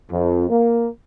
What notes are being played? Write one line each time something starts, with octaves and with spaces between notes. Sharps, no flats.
F2
A#3